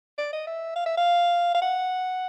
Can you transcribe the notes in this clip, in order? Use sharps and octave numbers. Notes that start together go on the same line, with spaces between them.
D5
D#5
E5
F5
E5
F5
F5
F#5